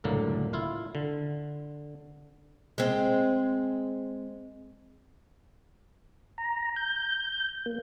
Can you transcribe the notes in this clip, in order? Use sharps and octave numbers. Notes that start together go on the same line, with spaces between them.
C#2 F#2 A2 D3 A#3
E4 F4 F5
D3
G#3 C4
A#5
G6
A#3